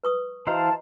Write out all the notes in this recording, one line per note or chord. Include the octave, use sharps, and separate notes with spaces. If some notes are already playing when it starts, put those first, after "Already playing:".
B4 C#6 D#6
E3 F#4 C5 D#5 F5 A5 A#5